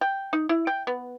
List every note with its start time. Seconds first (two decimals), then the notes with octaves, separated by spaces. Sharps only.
0.01 G5
0.33 D#4
0.49 E4
0.67 G5
0.87 B3